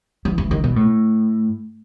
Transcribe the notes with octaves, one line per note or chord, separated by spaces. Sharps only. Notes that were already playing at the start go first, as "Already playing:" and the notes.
E3
E3
D#3
B2
A2